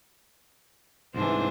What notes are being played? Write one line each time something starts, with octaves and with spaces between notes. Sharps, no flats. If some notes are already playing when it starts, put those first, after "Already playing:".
C2 G#2 E3 D4 C5